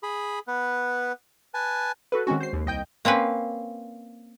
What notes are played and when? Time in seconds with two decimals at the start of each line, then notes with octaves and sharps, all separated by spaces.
0.03 G#4 B5
0.48 B3 B4
1.54 B4 G#5 A5
2.12 F#4 A4 B4
2.27 D#3 G#3 C4 C#4 F#4
2.41 C5 C7
2.53 D#2
2.66 C2 D#5 G5 G6
3.05 A#3 C4 C#4 B4